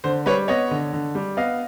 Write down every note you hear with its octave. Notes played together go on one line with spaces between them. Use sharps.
D3 C5
G3 B4 C#5
B3 C#5 D#5
D3
D3
G3
B3 D#5 F5